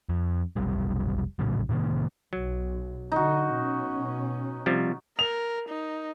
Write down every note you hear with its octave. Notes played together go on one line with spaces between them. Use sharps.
F2
F1 B1 G3
A#1 A2 C#3 F#3
A2 C3 D#3 A#3
B1 F#3
D3 D#4 F#4
B2 C#4
C3 F3 G3
A#4 F7
D#4